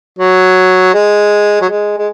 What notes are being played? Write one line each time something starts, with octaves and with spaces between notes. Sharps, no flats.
F#3
G#3
F#3
G#3
G#3